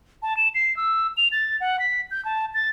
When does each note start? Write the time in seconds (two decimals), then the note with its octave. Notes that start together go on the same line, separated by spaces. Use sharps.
0.22 A5
0.37 E7
0.55 C7
0.77 E6
1.17 F7
1.32 A6
1.61 F#5
1.79 B6
2.11 G6
2.25 A5
2.54 A6